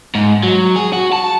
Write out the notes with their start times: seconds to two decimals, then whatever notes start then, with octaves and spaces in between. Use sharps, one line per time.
0.15 G#2
0.43 F#3
0.76 G#4
0.93 F#4
1.12 A5